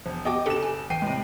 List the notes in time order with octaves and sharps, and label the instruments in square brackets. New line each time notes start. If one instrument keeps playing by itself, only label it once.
[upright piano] E1 [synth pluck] F3
[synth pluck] B3 F#4 G4 [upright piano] D#5 G5 D6
[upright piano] F#1 E7 [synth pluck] D4 G4 A4
[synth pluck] G#5
[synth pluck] E3 [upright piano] G5 C7 D#7
[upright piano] A2 C3 [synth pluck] G#3